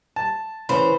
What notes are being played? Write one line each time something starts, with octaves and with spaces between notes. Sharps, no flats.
A5
C#3 E3 C5 B5